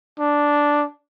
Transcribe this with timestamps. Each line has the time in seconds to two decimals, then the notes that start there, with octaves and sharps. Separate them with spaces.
0.19 D4